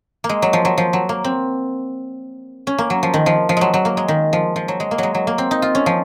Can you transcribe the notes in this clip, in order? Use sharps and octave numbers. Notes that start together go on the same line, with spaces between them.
A#3
G#3
F#3
F3
F#3
F3
F#3
A#3
C4
C#4
A#3
F#3
F3
D#3
F3
F3
F#3 G#3
F#3
A#3
G#3
D#3
F3
F3
F#3
G#3
A#3
F#3 G#3
F#3
A#3
C4
D#4
F4
C#4
F3